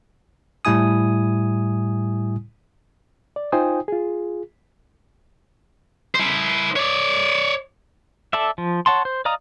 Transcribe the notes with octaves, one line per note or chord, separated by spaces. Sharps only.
A2 G3 E4 G#5 D#6
D5
D#4 F4 C5 G5 G#5 D#6
F4 G#4
E4 C5
C#5 D5
A4 D5 E5
F3
C#5 F#5 A5 C6
C5
D5 D#5 F5 A#5 D#6